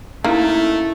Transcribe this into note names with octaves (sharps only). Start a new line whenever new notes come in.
A3 A#3 C#4 D#4 E4 A4